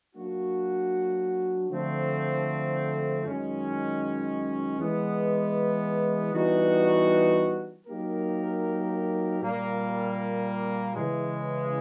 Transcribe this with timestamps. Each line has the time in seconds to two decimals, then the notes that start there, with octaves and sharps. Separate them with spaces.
0.15 F#3 A#3 D4 F#4
1.70 D3 F3 A3 C4
3.24 F#2 D#3 G#3 C#4
4.79 E3 G#3 B3
6.33 E3 G3 B3 D#4 F#4
7.87 F#3 A#3 D#4 G4 A#4
9.41 A#2 G3 A#3
10.96 C#3 E3 G#3